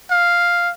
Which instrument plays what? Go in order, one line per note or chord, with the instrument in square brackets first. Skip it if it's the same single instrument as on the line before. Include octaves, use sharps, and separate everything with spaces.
[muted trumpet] F5